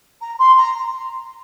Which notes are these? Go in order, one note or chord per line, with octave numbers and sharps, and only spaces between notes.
A#5
C6
A#5